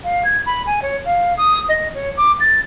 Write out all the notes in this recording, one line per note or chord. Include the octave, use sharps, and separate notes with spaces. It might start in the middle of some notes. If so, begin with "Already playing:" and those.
F5
G#6
B5
G#5
C#5
F5
D#6
D#5
C#5
D6
A6